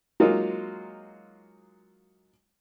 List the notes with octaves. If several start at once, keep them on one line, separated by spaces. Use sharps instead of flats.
F#3 G#3 A#3 D#4 F4